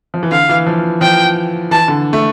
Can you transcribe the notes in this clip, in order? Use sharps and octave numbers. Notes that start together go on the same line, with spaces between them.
F3
E3
D3 F5
E3
F3
F3 G5
E3 A5
D3
A3